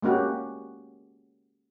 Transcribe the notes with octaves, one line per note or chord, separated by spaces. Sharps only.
G#3 A#3 C#4 F#4 G4